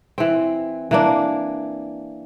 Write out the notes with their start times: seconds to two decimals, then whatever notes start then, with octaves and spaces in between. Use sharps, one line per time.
0.18 E3 C4
0.91 E3 A#3 D4